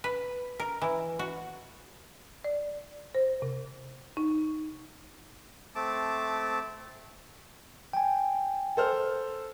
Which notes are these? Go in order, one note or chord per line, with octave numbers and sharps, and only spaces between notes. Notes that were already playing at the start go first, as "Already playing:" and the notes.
B4
A#4
E3
F#4
D5
C5
C3
D#4
A3 C4 A5 D6
G5 G#5
A4 C5 F6